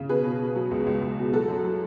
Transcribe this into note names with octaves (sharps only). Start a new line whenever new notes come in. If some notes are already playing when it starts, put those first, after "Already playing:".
Already playing: C#3
B2 G#4 B4
B2
B2
F#3
C#2
C#2
C#2
B2
F#3 F#4 A4
F#2
F#3